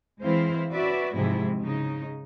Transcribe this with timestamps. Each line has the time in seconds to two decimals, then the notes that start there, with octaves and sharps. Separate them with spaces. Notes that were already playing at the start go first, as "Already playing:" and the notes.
0.22 E3 G#3 C4 E4 C5 F5
0.74 C#4 F#4 B4 D5 E5
1.15 G#2 C3 F3 F#3 G#3 E4
1.60 C#3 D#4